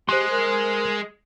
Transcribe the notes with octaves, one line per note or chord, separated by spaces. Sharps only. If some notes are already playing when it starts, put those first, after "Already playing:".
G#3 G4 C5 C6 D#6 F#6
A#4